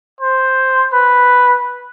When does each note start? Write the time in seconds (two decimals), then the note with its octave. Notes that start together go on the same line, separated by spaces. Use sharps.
0.21 C5
0.93 B4